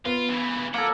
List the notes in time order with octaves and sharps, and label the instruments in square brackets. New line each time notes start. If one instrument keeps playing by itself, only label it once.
[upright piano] B3 [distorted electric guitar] F4
[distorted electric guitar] C#3 E3
[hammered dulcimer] A#3 A4 [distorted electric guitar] C#5 F#5